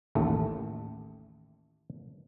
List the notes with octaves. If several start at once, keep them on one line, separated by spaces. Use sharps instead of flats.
A1 D#2 A3